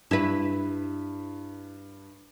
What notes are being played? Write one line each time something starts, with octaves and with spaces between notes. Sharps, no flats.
G2 E4 B4